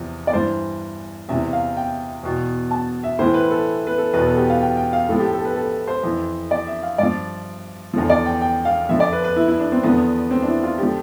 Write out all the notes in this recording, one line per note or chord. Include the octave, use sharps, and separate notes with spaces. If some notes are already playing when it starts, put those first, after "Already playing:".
Already playing: E2 C3 F3
D5
G2 E3 C5
E2 C3 E3 E5
F5
G5
E2 B2
A5
E5
A2 E3 C5
B4
A4
B4
A4
E2 B2 B4
A4
G4
F5
G5
G5
F5
A2 F3 A4
G4
A4
B4
A4
C5
F2 E3
D5
E5
F5
G2 F3 D5
E2 D3 F3
D5
G5
G5
F5
F2 D3 F3 E5
D5
B4
B4
E4
E4
D4
C4
E2 D3 F3 B3
C4
D4
E4
F4
D3 F3 G4